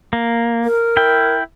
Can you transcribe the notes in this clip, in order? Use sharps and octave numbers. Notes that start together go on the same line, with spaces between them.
A#3
A#4
E4 G5